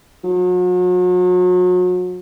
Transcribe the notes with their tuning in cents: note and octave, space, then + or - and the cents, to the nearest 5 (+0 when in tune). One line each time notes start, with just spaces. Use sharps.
F#3 -40